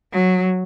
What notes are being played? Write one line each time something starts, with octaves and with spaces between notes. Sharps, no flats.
F#3